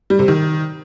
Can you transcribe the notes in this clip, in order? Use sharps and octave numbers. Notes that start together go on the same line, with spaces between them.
G3
C3
D#3